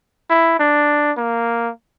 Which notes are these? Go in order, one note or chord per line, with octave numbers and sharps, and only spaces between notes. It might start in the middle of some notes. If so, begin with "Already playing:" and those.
E4
D4
A#3